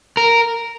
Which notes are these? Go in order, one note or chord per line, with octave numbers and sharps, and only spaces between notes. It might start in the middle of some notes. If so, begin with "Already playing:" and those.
A#4